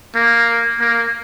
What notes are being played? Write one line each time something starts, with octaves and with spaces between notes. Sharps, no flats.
A#3
A#3